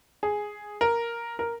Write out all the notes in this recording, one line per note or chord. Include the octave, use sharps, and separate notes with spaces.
G#4
A#4
A#4